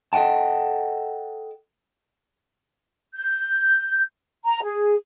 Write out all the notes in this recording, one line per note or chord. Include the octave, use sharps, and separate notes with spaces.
A4 D#5 F#5 G5 A5
G6
A#5
G#4